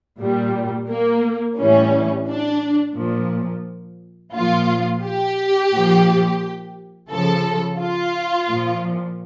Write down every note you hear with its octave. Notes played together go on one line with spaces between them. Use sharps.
A#2 G3
A#3
A2 E3 G3 C#4
D4
A#2 F3
A#2 F3 F4
G4
A#2 F3
C#3 F3 A4
F4
A#2 F3